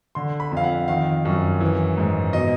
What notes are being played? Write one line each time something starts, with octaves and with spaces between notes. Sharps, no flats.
D3 C6
B5
F2 F5
F#5
D#3 F5
F#2
E3
G#2
B2 D#5